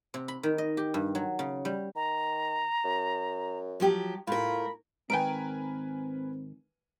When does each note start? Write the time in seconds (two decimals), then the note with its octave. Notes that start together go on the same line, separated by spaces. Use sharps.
0.14 C3
0.28 B5
0.43 D#3
0.58 D#5
0.77 G4
0.94 G2
1.15 F#3
1.39 C#3
1.65 G3
1.96 D#3 A#5
2.84 F#2
3.80 F3 F#3 G4
4.27 A2 F4 A#4 B5
5.10 G#2 D#3 C4 A#4 B4 G5 G#5 D7